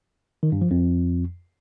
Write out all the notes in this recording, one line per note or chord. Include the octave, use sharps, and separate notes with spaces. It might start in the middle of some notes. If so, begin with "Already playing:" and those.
D#3
G2
F3
F2